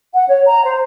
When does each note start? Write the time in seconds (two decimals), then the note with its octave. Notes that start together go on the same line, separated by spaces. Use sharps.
0.14 F#5
0.28 C#5
0.47 A#5
0.66 C5